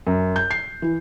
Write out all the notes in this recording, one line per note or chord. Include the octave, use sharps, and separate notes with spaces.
F#2
G6
C7
E3